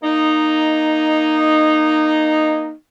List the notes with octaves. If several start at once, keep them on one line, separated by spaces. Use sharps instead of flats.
A#3 D#4